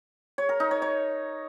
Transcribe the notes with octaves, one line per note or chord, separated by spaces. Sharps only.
C#5
A#4
D#4
C#5
C#5